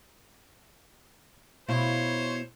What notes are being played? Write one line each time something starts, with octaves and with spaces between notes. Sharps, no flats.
B2 E4 F4 C5 C#5